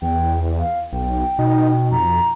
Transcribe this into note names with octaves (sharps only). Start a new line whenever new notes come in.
E2 G5
F5
B1 G5
B2 D#4
F2 A#5